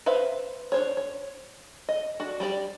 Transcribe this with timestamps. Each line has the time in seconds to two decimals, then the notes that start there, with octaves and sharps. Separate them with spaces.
0.06 B4 C5 E5 F5
0.72 D4 C5 C#5
0.97 C#5
1.89 D#5
2.20 D4 F#4
2.40 G3 G4 D5